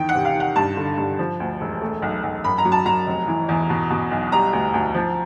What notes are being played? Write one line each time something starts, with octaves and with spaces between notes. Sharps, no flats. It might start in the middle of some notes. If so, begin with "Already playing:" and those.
Already playing: E2 D#3 G5
F#5
C3
F5
D#3
F#5
G2 A5
D3
G2
F3
D2
E1
A3
B1
B1
F#2 B5
A#5
F#3
A5
F#3 A#5
F1
E3
E2
B2
B2
B1
G3 A#5
D2
D2
F3